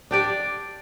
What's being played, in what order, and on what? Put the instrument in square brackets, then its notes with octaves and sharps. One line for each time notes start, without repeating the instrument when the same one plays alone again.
[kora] D4 G4 D5